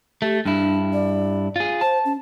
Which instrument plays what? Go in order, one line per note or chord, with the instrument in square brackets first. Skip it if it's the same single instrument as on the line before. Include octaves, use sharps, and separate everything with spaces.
[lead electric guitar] A3 [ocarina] G4
[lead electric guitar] G2 E4 [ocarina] D4
[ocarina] D5
[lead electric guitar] F4 G#4
[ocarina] C5 [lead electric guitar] A5
[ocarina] C#4